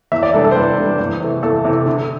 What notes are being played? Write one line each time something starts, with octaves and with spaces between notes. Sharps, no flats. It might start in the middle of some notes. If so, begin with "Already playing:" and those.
E2 E5
D5
C3 G3 D4 A4
A4
C5
E2 B4
C3 G3 D4
E2
C3 E3 A3
E2 A4
C3 E3 A3
D3